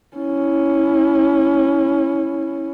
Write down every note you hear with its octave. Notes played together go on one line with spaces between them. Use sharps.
C#4 E4